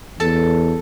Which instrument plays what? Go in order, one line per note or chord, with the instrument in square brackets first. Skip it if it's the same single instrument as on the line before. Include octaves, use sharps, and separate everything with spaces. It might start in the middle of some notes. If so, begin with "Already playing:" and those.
[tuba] E2 [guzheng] A4 A5